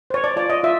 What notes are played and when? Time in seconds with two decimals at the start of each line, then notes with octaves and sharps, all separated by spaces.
0.10 C5 C#5
0.24 D5
0.36 F4 D5
0.50 D#5
0.63 F4 E5